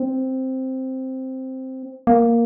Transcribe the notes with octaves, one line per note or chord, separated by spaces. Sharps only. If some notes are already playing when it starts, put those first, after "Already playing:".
Already playing: C4
A#3